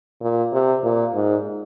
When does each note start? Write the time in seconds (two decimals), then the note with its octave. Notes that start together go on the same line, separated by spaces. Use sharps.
0.21 A#2
0.53 C3
0.83 A#2
1.14 G#2